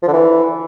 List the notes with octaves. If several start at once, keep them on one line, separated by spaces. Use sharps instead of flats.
F3
D3
E3